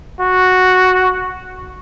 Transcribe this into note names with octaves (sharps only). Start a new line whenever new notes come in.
F#4